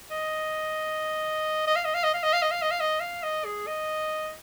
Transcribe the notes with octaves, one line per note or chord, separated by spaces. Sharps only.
D#5
D#5
F5
D#5
F5
D#5
F5
D#5
F5
D#5
F5
D#5
F5
D#5
F5
D#5
G#4
D#5